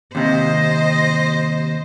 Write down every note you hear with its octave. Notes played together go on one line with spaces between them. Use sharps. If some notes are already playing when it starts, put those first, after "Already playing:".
D#2 C3 C5 D#5